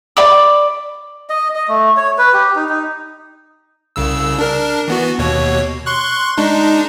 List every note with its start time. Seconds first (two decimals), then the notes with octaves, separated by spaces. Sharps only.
0.17 D5 B5 D6
1.30 D#5
1.55 D#5
1.68 A3
1.97 C#5
2.18 B4
2.33 G4
2.55 D#4
2.69 D#4
3.96 C2 C#3 E6
4.39 D4 A#4
4.88 E3 B3 F#4
5.19 D#2 B2 C#5
5.86 C6 C#6 F#6
6.38 G#3 D4 D#4